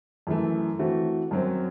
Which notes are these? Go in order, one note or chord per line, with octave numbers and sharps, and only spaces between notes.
F#2 E3 A3
E3 A3 C4 F#4
F#2 F#3 C4